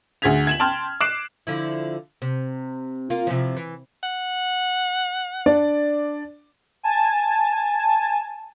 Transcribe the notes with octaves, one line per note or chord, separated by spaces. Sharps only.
D2 G#4 G#6 B6 F7
G#6 E7 F#7
G5 A5 C6 F6
D6 F#6 C7 D7 E7
D3 F3 E4
C3
A#3 F4
C3 E3 F3
E3
F#5
D4 D5
G#5 A5